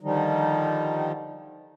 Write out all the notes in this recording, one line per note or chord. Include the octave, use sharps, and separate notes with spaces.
D3 D#3 F3 G3 D#4